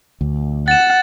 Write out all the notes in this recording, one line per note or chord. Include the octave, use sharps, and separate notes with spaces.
D2
F#5 A6 E7